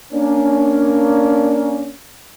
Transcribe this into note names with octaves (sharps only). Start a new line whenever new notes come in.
A#3 C#4 D4